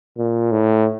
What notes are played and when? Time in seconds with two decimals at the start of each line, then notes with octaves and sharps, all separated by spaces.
0.18 A#2
0.52 A2